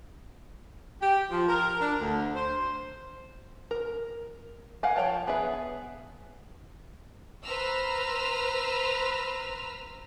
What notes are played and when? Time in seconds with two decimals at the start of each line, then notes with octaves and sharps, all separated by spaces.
1.01 G4
1.31 F3
1.48 A#4
1.80 D4
2.01 D2
2.35 C5
3.71 A#4
4.83 A#4 F5 F#5 G#5
4.96 F3 A#4 C#5 G5 A5
5.27 B3 G#4 B4 E5
7.43 B4 C5 A#5 E6 F6